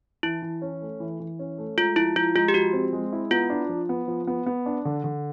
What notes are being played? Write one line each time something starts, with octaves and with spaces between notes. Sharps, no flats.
E3 E4
E3
C#4
A3
E3
E3
C#4
A3
G#3 F4
F3 E4
F3 F4
G#3 F4
G4
F3 F#4
C4
G#3
E4
B3 F4
D4
F3
B3
F3
B3
B3
D4
D3
D3